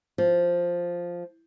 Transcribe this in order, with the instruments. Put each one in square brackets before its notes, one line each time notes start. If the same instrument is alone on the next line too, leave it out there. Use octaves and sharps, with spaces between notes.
[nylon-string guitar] F3